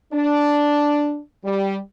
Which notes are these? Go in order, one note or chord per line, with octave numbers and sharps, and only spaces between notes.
D4
G3